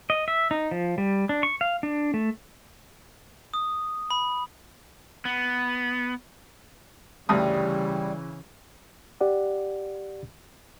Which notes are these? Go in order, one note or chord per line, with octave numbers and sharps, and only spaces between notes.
D#5
E5
D#4
F3
G3
D4
C#6
F5
D4
A3
D#6
B5
B3
D2 G2 C#3 E3 G3 D#6
G4 D5 F#5